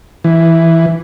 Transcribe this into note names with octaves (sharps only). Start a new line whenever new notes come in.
E3